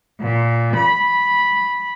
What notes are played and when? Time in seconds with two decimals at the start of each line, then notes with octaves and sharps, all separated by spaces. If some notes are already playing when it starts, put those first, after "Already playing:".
0.20 A#2
0.77 B5